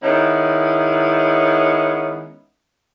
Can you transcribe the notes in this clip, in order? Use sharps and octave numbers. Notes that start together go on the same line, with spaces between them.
D#3 G#3 B3 C#4 E4